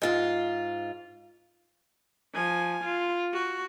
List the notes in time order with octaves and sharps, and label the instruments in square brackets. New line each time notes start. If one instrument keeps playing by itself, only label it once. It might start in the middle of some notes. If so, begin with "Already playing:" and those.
[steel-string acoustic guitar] G#2 F4
[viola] F3 G#5
F4
F#4